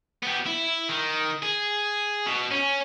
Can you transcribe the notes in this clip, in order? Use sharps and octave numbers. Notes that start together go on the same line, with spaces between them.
B3 G4
E4
D#3
G#4
B2
C#4